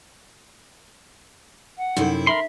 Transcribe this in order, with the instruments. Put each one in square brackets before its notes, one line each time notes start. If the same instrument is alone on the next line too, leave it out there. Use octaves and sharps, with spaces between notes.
[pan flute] F#5
[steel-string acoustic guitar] F#2 C3 E4 [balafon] D#4 A4
[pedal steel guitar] A#4 B5 C6 [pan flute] E5